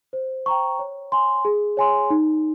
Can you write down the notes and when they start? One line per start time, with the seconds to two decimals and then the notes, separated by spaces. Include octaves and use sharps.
0.13 C5
0.46 G5 A#5 C#6
0.79 C#5
1.12 G#5 C6
1.45 G#4
1.77 C#5 G#5 C6
2.10 D#4